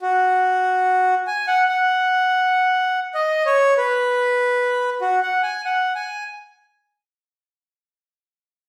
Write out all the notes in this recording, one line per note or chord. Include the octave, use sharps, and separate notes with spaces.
F#4
G#5
F#5
F#5
D#5
C#5
B4
F#4
F#5
G#5
F#5
G#5